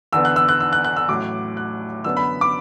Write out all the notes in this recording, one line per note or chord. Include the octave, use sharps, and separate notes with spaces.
E2 D3 B3 E6
F#6
E6
F#6
E6
F#6
F#6
E6
A1 A2 F#3 D6
F#6
F#2 D3 B3 E6
B5
D6